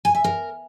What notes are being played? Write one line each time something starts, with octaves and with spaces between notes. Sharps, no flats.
G#5
E5
A#4